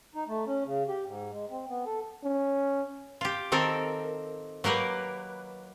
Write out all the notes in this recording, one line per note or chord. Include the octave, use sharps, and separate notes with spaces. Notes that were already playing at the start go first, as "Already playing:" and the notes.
D#4
A3
C#4
C#3
G4
G#2
G#3
C4
B3
A4
C#4
F4 G4
D#3 C4 A4 A#4
F#3 A#3 G4 A#4 B4